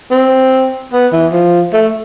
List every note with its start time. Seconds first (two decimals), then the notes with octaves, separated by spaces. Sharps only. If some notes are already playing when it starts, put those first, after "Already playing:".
0.11 C4
0.93 B3
1.12 E3
1.32 F3
1.73 A3